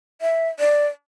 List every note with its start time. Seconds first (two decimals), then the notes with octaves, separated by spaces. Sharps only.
0.21 E5
0.60 D5